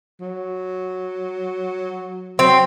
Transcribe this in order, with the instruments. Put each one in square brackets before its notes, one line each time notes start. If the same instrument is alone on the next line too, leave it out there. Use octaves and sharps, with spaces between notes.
[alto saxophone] F#3
[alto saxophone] F#3 [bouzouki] C4